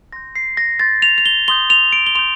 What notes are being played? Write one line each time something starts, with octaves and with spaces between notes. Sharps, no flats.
C6 G6 A#6
C7
A#6
C6 G6 A6
F7
F7
G7
C6 D#6 G6 G7
F7
D7
G7
C6 D#6 G6 F7